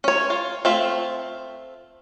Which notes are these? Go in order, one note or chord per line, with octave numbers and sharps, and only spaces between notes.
C#4 C#5
F4
A3 C4 F4 E5